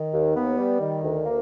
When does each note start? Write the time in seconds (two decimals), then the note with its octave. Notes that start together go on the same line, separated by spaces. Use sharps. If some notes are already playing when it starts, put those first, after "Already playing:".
Already playing: D#3
0.12 D#2
0.35 B3
0.58 G3
0.80 D#3
1.04 D2
1.26 A#3